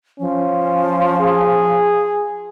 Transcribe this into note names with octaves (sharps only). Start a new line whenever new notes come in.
F3 C#4
G#4